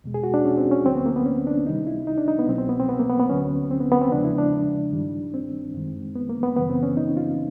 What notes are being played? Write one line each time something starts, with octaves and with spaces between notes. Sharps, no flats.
E2 B2 G#3
G#4
F#4
D4
C#4
C4
C#4
D2 D3 F#3 C4
B3
A#3
B3
C#4
D4
C#2 C3 D#3 G3 D#4
E4
D#4
D4
D#4
B3
C2 B2 F#3 C4
C4
B3
C4
B3
A#3
B3
B3
D2 D3 F#3 C#4
C4
B3
B3
C4
E2 C#3 F3 G#3 D4
E4
D4
G2 D#3 G3
C4
F#2 D#3 G#3
B3
A#3
B3
F#2 C#3 E3 G3 B3
C4
C#4
D#4
F4